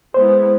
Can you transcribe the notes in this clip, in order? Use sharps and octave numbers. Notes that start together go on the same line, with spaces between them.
G#3 B3 E4 C5